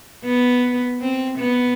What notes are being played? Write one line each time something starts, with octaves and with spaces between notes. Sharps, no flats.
B3
C4
B3